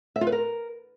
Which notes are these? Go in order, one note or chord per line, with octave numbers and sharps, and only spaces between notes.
E5
F4
B4
A#4